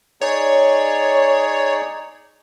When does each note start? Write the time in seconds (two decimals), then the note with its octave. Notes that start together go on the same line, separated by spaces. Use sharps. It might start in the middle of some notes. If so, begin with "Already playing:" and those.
0.21 D#4 G#4 C#5 D5